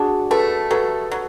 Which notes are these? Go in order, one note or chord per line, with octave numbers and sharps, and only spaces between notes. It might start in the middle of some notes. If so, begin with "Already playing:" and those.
Already playing: D4 F#4 G#4
A3 A4 B4
F#3 A4 B4
F#3